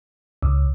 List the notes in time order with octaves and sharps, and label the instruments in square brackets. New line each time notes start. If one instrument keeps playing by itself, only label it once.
[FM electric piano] C#2